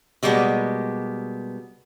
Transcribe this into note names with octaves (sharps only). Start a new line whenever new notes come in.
B2 G3 G#3 A#3 B3